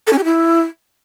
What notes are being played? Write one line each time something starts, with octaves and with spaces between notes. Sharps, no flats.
A4
C#4
G4
E4